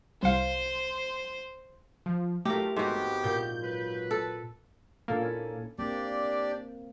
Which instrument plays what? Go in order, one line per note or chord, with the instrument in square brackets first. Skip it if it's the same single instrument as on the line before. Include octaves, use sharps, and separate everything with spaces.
[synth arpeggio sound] C2 F5 [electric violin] C5
[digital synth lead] F3
[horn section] F#3 E4 F4 [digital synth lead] A3 [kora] G4 A#4
[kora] G#2 F#4 [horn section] B3 G4 [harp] C4
[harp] A#2 [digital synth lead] G6
[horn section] F#3 B4
[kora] A4
[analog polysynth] A#2 A#3 [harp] D4 A4
[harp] C#4 E4
[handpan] A#3 C4 [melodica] D4 G4 D5